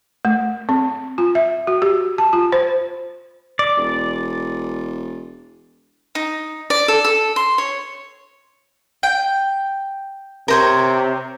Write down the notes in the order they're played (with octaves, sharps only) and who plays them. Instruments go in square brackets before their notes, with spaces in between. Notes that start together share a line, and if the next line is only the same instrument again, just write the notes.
[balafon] A3
C4
F4
E5
F#4
G4
A5
F4
C5
[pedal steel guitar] D5
[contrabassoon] E1
[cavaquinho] D#4
D5
A4
A4
C6
C#5
[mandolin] G5
[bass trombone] C3 [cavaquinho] A#4 C5 C#5